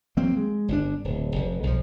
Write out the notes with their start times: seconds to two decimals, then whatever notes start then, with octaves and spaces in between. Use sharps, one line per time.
0.17 F3 F#3 A#3 C4
0.37 G#3
0.68 G1 D3 D4
1.04 D1
1.36 F1
1.63 B1 F3